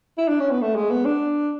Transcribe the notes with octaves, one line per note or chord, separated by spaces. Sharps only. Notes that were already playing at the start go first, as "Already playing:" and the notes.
E4
D4
C#4
B3
A3
G#3
B3
D4